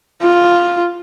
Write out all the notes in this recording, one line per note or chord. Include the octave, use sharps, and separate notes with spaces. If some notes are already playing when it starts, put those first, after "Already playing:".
F4